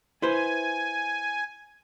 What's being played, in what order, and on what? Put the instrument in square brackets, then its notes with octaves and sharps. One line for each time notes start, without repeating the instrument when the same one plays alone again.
[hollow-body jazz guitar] E4 B4 C5 [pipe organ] G#5